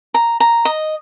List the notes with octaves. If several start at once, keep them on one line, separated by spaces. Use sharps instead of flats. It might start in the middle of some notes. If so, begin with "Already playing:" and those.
A#5
A#5
D#5